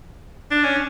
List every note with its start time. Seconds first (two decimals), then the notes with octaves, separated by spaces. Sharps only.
0.51 D4
0.64 C#4